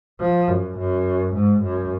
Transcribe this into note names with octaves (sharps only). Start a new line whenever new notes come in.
F3
F#2
F#2
G#2
F#2